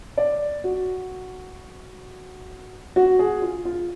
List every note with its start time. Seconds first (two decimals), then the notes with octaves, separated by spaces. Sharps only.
0.17 D5
0.64 F#4
2.96 F#4
3.19 G#4
3.42 F4
3.65 F4